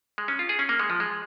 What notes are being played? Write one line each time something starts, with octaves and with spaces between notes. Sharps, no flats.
G#3
C#4
F4
G#4
C#4
A#3
G#3
F3
G#3